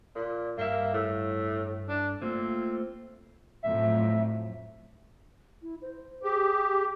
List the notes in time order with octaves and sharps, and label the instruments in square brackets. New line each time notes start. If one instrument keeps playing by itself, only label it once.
[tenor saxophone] A#2
[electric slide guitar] G2 E5 [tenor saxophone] A#3
[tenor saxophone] A2
D4
[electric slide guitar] A3 A#3 F4 [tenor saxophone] C4
[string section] F2 A2 F#3 [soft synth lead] E5
[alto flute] E4
C5
[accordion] G4 [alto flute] G#4